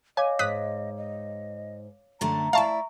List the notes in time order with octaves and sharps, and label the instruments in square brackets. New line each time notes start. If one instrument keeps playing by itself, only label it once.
[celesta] C#5 F5 D6 [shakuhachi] D#5 [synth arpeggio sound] G#5
[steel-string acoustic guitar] G#2 [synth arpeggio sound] D#6 F#6 B6
[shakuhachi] D#5
[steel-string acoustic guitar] F#2 D3 A3 [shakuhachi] A#5
[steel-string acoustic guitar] E4 D5 [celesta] E5 C#6 [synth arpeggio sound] F5 A5